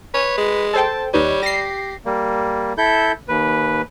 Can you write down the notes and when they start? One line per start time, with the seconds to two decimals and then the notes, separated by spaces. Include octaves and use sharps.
0.14 B4 C#5
0.38 G#3
0.73 A4 C5 G5 A5
1.14 D#2 G3 D#4 B4 C#5
1.42 G4 A#6 C7
2.05 G3 A#3
2.78 E4 A4 G6
3.28 D#2 B4